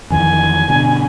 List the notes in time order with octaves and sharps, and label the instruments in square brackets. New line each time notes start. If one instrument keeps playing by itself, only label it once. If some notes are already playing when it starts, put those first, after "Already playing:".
[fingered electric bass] F2 D#3 E3 [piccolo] G#5
[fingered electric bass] G2 B2 D3